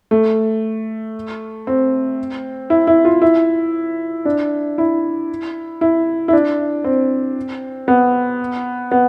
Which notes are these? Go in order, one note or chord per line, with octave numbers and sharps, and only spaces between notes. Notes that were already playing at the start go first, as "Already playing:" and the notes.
A3
C4
E4
E4
F4
E4
D4
E4
E4
E4
D4
C4
B3
B3